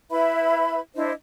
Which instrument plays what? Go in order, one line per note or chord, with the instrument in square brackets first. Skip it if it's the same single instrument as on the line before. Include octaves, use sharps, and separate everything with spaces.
[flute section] E4 B4 E5 B5
D4 E4 C5 D#5